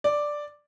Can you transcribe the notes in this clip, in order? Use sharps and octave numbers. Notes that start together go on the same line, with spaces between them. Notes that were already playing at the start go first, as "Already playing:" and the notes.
D5